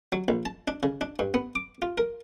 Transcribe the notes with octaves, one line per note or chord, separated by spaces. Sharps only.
F#3
A#1
A5
D4
C#3
D4
G2
B3
D6
F4
A#4